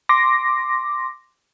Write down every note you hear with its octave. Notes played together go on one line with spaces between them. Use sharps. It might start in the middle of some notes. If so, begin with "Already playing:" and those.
C6 D6 A#6